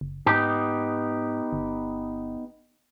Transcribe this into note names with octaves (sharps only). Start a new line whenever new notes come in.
F#1
G#2 B3 D#4 G4
G1